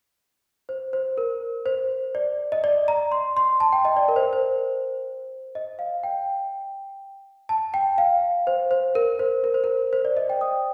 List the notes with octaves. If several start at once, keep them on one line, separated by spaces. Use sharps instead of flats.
C5
C5
A#4
C5
D5
D#5
D5
A#5
C6
C6
A5
G5
D#5
D5
A#4
C5
A#4
C5
D#5
F5
G5
A5
G5
F5
C5
C5
A#4
C5
A#4
C5
A#4
C5
D5
D#5
G5
D#6